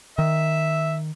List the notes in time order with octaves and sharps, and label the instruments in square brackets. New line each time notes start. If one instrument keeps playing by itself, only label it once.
[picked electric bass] D#3 [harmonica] E5